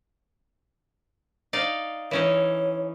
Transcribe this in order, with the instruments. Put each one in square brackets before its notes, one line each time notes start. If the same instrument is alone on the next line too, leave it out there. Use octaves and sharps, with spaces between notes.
[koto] D#4 D5 F5
[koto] E3 C#4 D#4 [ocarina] C#5